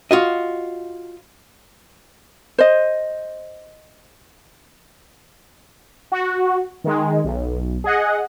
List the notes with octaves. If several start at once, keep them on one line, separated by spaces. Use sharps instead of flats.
F4 F#4 D#5
C5 D#5
F#4
D#3 G#3
B1
G#4 D#5 F#5